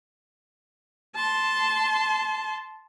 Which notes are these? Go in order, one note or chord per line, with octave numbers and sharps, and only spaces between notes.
A5 C6